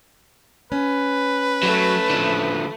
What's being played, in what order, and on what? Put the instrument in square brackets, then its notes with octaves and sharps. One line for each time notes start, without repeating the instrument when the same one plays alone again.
[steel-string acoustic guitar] C#4 [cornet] B4
[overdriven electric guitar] F#3 [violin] A3
[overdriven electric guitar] D3 F3